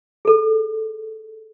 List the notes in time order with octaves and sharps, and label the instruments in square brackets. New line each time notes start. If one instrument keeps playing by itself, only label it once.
[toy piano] G#4 A4